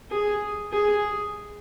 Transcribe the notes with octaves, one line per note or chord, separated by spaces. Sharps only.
G#4
G#4